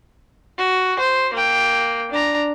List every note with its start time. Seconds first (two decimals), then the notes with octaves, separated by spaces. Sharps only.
0.58 F#4
0.99 C5
1.33 A#3 G5
2.11 D4 A#5